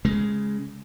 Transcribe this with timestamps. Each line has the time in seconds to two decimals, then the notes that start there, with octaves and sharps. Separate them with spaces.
0.05 C#3 G#3